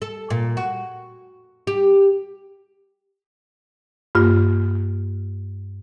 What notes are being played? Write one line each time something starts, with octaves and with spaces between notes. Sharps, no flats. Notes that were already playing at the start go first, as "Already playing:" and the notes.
A4
A#2
F#4
G4
G2 A#3 F4